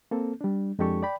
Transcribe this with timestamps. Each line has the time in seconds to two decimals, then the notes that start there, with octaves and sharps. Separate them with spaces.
0.11 A#3 C4 A4
0.41 G3 D4
0.79 F2 G#3 D4 G4 A4 C#6
1.03 D5 G5 B5